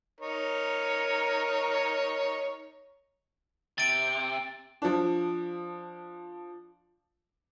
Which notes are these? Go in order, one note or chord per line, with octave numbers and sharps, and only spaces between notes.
D#4 A#4 C#5
C3 A6 D7
F3 D4